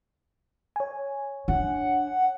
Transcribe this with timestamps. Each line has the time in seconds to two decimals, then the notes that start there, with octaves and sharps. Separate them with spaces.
0.76 C#5 G#5
1.48 D4 F#5